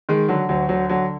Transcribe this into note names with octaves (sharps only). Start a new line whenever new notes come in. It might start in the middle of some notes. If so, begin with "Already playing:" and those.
D#3 G#3
D3 F#3
D2 F#3
D3 F#3
D3 F#3